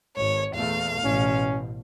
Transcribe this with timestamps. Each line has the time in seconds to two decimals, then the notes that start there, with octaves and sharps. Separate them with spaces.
0.16 G#1 C#5
0.55 E2 A#2 A3 F5
1.05 A1 B2 C#4